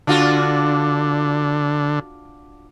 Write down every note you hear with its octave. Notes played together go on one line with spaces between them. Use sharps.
D3 D4 F4 F#4